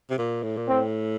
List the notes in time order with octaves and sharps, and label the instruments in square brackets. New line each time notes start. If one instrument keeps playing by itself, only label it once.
[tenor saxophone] C3
A#2
A2
A#2
[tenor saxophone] A2 [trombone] C4